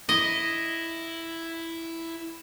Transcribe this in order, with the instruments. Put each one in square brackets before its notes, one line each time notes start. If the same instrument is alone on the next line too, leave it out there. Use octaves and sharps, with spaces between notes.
[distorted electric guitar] E4 [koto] D#5